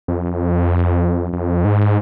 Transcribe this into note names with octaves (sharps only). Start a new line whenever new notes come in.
F2
F2
G#2